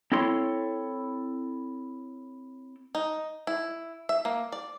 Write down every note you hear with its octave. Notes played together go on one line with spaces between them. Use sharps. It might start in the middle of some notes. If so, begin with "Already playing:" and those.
C4 E4 A4 C#5 C6
D#4
E4
E5
A#3
D5